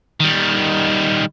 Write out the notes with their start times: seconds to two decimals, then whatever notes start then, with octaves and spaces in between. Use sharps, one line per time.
0.20 D#3 G3